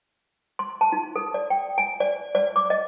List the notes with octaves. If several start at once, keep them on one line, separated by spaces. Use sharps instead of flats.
C6
A5
D#4
A4
D5
G5
G#5
D5
D5
D6
D#5